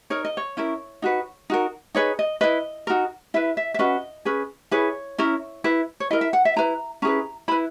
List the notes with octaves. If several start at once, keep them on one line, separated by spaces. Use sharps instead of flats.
D#4 A#4 C#5
D#5
C#5
C#4 E4 A#4
D#4 F#4 B4
D#4 F#4 A#4
D#4 G#4 B4 C#5
D#5
E4 B4 D#5
D#4 F#4 A#4
E4 B4 E5
E5
E5
C#4 F#4 B4 D#5
C#4 G#4 B4
E4 G#4 B4 C#5
C#4 E4 A#4
E4 B4
C#5
E4 A#4 D#5
E5
F#5
E5
E4 B4 A#5
C#4 E4 G#4 B4 A#5
E4 B4 B5